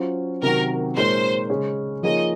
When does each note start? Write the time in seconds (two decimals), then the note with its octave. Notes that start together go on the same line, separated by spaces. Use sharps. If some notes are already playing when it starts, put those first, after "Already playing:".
Already playing: F#3 C#4 F4 C5
0.42 C3 D#3 F#3 C4 F#4 A#4
0.95 A#2 G#3 D#4 A#4 C5 C#5
1.50 C#3 G#3 C#4 G#4 C#5
2.03 F3 A#3 D#4 G#4 C#5 D#5